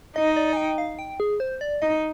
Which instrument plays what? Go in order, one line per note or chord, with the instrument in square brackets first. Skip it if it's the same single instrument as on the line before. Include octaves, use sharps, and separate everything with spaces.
[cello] D#4 [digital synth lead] D#5
[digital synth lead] D5
G#5
G5
F5
G5
G#4
C5
D5
[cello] D#4 [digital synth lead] D#5